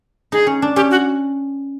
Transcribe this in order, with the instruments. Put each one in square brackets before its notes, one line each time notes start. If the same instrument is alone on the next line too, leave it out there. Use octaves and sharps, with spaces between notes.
[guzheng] D#4 [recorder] G#4
[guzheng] C#4
D4
[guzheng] C#4 [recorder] G4
[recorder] F#4